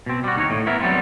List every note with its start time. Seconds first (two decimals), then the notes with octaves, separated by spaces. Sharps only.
0.06 B2 C4
0.24 G3 F#4
0.36 D#2 D#4 C#5
0.50 A2
0.66 B3 E4 A#4 E5
0.80 F#3 G3 B3 C4 F4